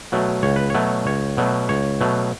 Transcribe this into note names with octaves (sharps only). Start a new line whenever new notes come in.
B2 F#3 A3
C#2 C#5
B4
B2 F#3 A3 C#5
C#2 C#5
B2 F#3 A3
C#2 C#5
B2 F#3 A3